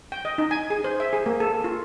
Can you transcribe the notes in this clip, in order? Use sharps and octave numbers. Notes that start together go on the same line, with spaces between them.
G5
D#5
D#4
G#5
G#4
C5
E5
G#4
A#3
A4
F4